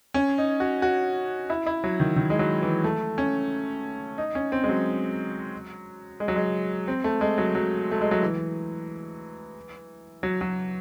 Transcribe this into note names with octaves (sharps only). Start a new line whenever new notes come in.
C#4
D#4
F#4
F#4
E4
E4
F#3
D#3
D#3
G#3
F#3
E3
A3
C#4
D#4
C#4
C4
G#3
F#3
G#3
F#3
G#3
C4
A3
G#3
F#3
F#3
A3
G#3
F#3
E3
F#3
F#3